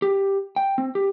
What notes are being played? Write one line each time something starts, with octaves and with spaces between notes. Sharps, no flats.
G4
G5
C4
G4